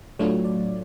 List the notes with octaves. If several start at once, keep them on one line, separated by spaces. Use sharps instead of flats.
A2 F#3 A3 D4 F4 C#5
D5